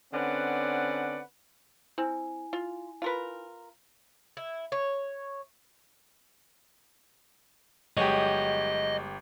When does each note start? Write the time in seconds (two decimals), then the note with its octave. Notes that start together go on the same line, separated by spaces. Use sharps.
0.14 D3 C4 C#4 B4 D5 F#5
1.98 C4 E4 G#5
2.53 F4
3.02 F4 A#4 B4
4.37 E4
4.72 C#5
7.97 G1 F#3 G#3 G4 D#5